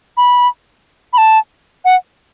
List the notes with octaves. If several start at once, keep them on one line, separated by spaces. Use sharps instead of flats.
B5
B5
A5
F#5